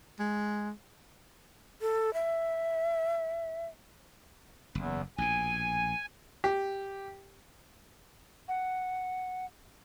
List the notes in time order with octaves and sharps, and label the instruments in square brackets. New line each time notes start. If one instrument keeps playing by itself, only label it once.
[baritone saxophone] G#3
[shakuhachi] A4
E5
[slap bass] F#1 [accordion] E2
[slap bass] A#1 B2 [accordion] G#5
[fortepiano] G4
[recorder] F#5